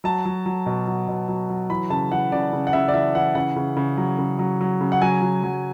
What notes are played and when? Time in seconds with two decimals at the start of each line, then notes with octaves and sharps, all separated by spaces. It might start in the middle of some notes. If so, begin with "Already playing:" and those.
0.04 F#3 A5
0.25 F#3
0.46 F#3
0.66 B2
0.87 F#3
1.08 B2
1.28 F#3
1.49 F#3
1.70 E3 B5
1.90 C#3 A5
2.11 E3 F#5
2.32 C#3 D5
2.53 C#3
2.67 F#5
2.73 C#3 E5
2.88 D5
2.94 E3 E5
3.15 E3 F#5
3.35 C#3 F#5
3.56 C#3
3.77 C#3
3.97 F#3
4.18 C#3
4.39 F#3
4.61 F#3
4.81 C#3
4.92 F#5
5.02 F#3 G#5
5.22 F#3
5.43 F#3